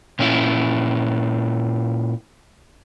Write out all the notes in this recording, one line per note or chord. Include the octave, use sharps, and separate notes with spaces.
A#2 C#4 E4